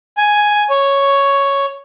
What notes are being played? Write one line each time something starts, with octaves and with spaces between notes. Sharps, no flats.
G#5
C#5